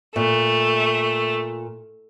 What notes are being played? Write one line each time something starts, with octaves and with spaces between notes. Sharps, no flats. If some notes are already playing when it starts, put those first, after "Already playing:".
A#2 A3